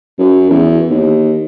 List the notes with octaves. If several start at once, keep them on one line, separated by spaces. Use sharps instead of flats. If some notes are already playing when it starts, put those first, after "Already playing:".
F#2
E2
D#2